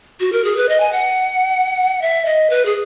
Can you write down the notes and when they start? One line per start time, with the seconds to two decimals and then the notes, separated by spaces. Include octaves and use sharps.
0.20 F#4
0.33 A#4
0.45 G#4
0.57 B4
0.69 D#5
0.80 G#5
0.92 F#5
2.02 E5
2.25 D#5
2.50 B4
2.65 G#4